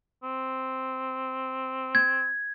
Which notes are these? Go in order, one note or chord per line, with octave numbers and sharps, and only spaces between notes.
C4
G#6